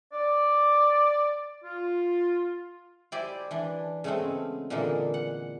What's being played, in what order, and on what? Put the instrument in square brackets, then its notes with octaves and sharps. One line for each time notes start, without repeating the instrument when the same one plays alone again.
[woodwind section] D5
F4
[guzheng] E4 G4 C5 D5 G#5
E3 D4
C#3 G#3 A3 B3 C4
A#2 D3 E3 G#3 A#3
F#5